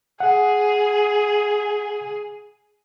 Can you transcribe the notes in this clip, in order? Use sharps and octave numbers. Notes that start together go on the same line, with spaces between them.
G#4 F#5